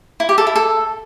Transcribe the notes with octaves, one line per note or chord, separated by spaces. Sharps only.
E4
G4
A4
E4
A4